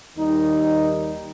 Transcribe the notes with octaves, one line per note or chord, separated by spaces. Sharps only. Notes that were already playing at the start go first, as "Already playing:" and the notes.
D#2 D#3 G3 D#4